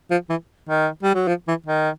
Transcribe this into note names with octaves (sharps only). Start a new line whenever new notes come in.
F3
E3
D#3
G3
F#3
F3
E3
D#3